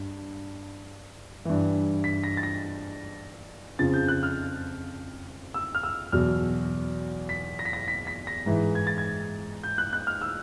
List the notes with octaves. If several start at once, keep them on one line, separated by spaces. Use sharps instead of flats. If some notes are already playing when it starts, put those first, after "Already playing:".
Already playing: G2
G2 E3
B6
A#6
A6
A#6
F2 C#3 F3 A6
G6
F#6
F6
E6
F6
E6
E2 B2 F#3 F6
B6
A#6
B6
A#6
B6
B6
A#6
G#2 E3
G#6
A6
G#6
G6
F#6
F#6
F6
E6